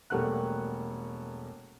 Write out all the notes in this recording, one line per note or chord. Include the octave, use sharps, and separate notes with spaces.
E1 G3 A3 A#3 F#5 F#6